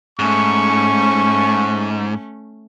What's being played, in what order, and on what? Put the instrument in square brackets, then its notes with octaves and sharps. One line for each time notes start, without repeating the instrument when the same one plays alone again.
[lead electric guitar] G#2 [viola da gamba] A3 C#4 [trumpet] C#6